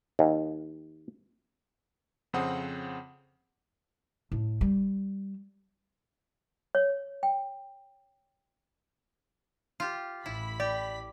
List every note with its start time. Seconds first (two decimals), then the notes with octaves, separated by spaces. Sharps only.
0.19 D#2
2.33 F2 C#3 C4 C5 F#5 D#6
4.32 A2
4.61 G3
6.75 C#5
7.23 G5
9.80 F4 G4
10.26 A1 E4 B5 B6
10.60 G4 D5